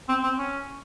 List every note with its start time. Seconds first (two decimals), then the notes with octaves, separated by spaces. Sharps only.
0.09 C4
0.23 C4
0.38 C#4